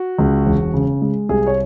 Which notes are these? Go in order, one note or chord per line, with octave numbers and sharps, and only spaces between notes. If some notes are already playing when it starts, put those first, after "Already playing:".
Already playing: F#4
C#2
E1
C#3
G#3
C2 G#4
C#5